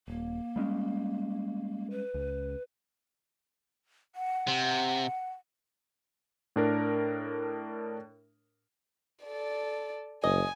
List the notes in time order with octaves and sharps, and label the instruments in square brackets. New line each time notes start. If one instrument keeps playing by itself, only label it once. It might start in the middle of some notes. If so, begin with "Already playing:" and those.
[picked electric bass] D#1 [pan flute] A#3
[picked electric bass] G3 G#3 C#4
[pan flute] B4
[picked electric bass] C#2
[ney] F#5
[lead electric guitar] C3
[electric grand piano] A2 D4 A#4
[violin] A4 D5
[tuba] F#1 [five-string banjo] D#5 [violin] G#5